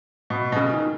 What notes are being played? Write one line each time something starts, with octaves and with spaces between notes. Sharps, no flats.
B2
B2
C#3
D#3